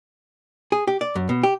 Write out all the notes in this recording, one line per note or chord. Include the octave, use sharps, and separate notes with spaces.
G#4
G4
D5
F#2
B2
G4